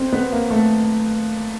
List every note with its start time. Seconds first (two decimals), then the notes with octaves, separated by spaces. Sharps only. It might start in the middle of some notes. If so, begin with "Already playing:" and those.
Already playing: C4
0.13 B3
0.32 A#3
0.50 A3